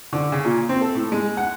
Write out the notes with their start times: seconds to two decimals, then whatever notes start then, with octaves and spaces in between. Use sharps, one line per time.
0.13 D3
0.32 C#3
0.45 A#2
0.69 C4
0.81 A4
0.95 A2
1.12 G#3
1.37 F#5